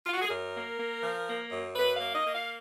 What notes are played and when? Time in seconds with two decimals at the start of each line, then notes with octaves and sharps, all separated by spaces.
0.06 F4
0.13 F#4
0.21 G#4
0.27 F#2 A#4
0.53 A#3
0.77 A#3
1.02 F3
1.26 A#3
1.51 F#2
1.76 F#2 B4
1.95 F5
2.01 A#3
2.13 D#5
2.25 A#3
2.32 F5